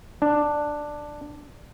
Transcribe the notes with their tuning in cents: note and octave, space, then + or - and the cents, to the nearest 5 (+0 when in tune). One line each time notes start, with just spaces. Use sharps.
D4 +5